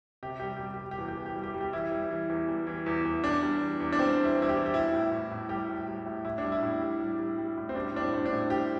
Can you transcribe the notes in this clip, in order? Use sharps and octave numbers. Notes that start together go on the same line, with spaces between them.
C3 G4
G3 G4
G4
G3
G4
G3
G4
E2
G4
E3
G4
G3
G4
G3
G4
E3 E4
G3
E3
E2
G3
E3
E2
E2
E2 D4
G3
E2
E2
D4
G3 C4
E2
E4
E2
E4
G4
E2
G4
G3 E4
A2
A2
A2
G3 G4
A2
G3
A2
A2 E4
D4
G3
E4
A2
G3
G3
G3
G3
A2
C4
G3 D4
A2 D4
C4
A2
D4
A2
G3 G4